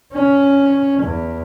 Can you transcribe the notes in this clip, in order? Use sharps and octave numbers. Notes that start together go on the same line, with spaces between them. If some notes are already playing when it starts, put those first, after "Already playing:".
C#4
E2